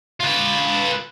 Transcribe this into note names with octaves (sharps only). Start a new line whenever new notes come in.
F4 B4